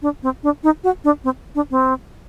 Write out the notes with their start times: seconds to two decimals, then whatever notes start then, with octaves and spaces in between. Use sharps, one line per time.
0.02 D4
0.23 C4
0.43 D4
0.63 D#4
0.84 F#4
1.04 D4
1.24 C4
1.55 D4
1.71 C4